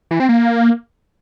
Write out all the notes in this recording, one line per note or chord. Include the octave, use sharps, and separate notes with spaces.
E3
C4
A#3